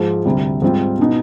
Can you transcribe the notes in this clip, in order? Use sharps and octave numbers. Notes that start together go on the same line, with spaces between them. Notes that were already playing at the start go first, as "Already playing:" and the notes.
Already playing: G#2 F3 G#3
D2 C3 G3
G#2 G3 C4 F4
B2 B3 D#4